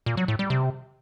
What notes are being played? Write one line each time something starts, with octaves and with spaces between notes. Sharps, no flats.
A#2
F#3
A2
G3
C3